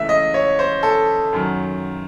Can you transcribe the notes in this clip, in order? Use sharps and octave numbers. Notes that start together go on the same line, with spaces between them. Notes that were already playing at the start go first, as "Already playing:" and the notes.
Already playing: C#2 C#3 E3 A3 E5
D#5
C#5
C5
A4
F#2 D#3 F#3